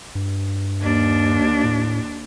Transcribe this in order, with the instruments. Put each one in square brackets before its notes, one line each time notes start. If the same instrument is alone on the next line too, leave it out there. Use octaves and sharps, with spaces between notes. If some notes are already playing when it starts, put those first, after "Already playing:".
[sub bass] G2
[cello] D#2 D4
[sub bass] A2